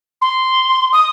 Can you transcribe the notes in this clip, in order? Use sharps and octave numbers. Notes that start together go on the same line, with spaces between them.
C6
D#6